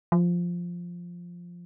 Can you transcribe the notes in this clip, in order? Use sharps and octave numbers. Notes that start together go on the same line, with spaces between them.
F3